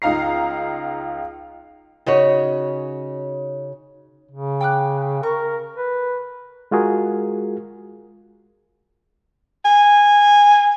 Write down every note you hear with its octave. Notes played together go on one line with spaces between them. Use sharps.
C#2 D#4 F5 A#5 C7
C#3 D#4 F#4 C#5
C#3
G5 D6 F#6
A#4 C#6
B4
G#3 F4 F#4 G#4 A#4
G#5